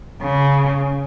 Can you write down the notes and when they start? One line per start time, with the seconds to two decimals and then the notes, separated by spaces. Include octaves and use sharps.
0.22 C#3